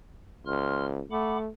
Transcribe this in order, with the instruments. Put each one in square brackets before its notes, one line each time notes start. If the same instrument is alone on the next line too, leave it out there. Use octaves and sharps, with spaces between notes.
[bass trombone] C#2 [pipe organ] C6 F6
[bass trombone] A3 [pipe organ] F#5 B5 D6